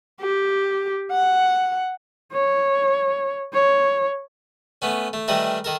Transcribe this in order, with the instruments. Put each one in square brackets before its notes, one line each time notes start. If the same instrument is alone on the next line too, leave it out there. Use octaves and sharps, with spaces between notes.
[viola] G4
F#5
[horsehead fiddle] C#5
C#5
[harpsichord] A3 B3 C#4
A3
D#3 E3 G3 A3 A#4
D#3 A4 A#4